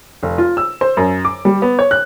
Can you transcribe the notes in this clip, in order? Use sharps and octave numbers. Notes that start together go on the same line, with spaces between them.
F1
F4
E6
C5
F#2
D6
G3
B3
C#5
F#6